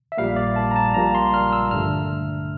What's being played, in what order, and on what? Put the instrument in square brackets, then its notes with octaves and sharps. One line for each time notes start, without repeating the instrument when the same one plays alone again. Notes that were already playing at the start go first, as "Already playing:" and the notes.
[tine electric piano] E5
A#1 A#2 G3 A#3 F5
D5
A5
A#5
A5
A#1 A#2 G3 A#3 A#5
C6
F6
E6
G2 D3 A3 F6